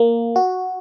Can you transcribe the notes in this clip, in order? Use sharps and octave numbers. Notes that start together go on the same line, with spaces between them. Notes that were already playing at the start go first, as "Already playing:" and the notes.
Already playing: A#3
F#4